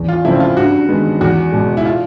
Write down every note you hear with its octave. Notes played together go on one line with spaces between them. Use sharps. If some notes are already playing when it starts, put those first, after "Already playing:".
Already playing: E2
F4
C#3 F3 A3 C4 E4
F4
G2 F#4
D#3 G#3 B3
E2 F#4
B2 G#3
E4
F4